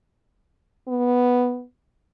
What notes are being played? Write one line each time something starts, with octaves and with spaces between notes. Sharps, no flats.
B3